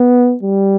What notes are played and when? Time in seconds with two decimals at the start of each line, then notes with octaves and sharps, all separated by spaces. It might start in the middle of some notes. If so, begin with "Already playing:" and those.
Already playing: B3
0.43 G3